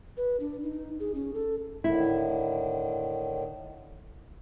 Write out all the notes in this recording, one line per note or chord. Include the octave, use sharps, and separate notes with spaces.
B4
D4
D#4
G#4
C#4
A4
A2 D3 D#3 E4